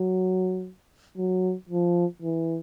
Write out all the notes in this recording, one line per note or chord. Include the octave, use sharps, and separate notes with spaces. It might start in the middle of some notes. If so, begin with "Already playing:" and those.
Already playing: F#3
F#3
F3
E3